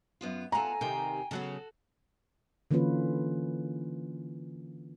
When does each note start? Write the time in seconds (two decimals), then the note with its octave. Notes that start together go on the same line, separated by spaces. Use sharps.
0.21 F#2 B3 F4
0.52 B3 F4 A4 F#5 G#5 A#5
0.81 C3 D#3 G5
1.31 C#3 F#3 B3 F#4 A4
2.71 D3 E3 A#3 C#4 F4 B4